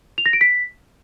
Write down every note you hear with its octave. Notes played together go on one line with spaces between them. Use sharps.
F7
A#6
D7
B6